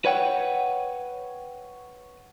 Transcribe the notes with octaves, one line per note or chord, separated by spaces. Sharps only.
B4 C#5 F#5 G5